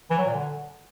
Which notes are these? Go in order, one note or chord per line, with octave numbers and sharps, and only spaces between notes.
E3
F#3
A#2
D3